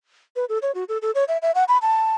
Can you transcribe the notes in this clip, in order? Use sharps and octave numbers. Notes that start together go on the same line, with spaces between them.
B4
A4
C#5
F#4
A4
A4
C#5
E5
E5
F#5
B5
A5